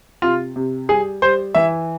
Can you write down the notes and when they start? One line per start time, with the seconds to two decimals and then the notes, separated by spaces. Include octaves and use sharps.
0.22 C3 F4
0.56 C3
0.89 G3 G#4
1.22 G3 C5
1.55 E3 E5